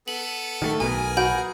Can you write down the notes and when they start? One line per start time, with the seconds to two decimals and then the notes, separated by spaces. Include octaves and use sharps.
0.08 B3 A4 F#7
0.62 D#3 G3 A3
0.80 B1 B2 B3 G#4 A#4 G#5
1.17 F#4 B5 G6 D7